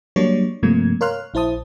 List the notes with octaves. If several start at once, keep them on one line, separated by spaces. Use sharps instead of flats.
F#3 G3 A#3 D4 C#5 D5
G2 C3 F3 A3 A#3 G#6
A#4 C#5 F5 C6 F6 F#6
A#1 E4 C5 A5 D#6